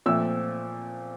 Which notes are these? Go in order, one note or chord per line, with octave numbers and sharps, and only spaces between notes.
A#2 F3 A3 C4 E6